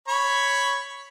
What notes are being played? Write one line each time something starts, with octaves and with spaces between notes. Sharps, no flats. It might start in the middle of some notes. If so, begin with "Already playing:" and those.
C#5 B5 C#6